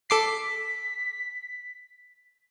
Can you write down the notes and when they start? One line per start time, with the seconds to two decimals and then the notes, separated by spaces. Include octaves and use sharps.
0.10 A4 D6 B6 C7